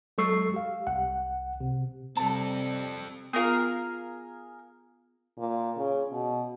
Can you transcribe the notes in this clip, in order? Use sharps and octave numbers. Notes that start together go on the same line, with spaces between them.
F#3 G#3 A4 C#6 E6 C7
G4 F5
C2 F#5
C3
C3 G3 C4 A4 A5
B3 F4 G#4 A#4 F5
A#2
C#3
B2